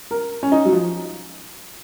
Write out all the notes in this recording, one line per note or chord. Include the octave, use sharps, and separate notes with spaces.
A#4
C#4
D#4
F#3
F3